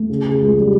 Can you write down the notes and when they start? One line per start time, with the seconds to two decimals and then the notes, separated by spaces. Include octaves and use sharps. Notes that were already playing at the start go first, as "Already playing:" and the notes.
Already playing: A3
0.09 C#3
0.25 C#3
0.41 C#2
0.58 G3